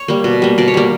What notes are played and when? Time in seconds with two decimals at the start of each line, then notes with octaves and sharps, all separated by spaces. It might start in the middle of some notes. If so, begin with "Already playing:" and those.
Already playing: C#5
0.08 G3 A#3
0.24 B2
0.42 G3 A#3
0.58 B2 D5
0.68 C#5
0.74 G3 A#3 D5